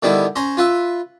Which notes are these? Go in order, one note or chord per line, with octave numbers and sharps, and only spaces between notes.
D3 D#3 G3 B3 E4
C#4 C5 A#5
F4 B4 E5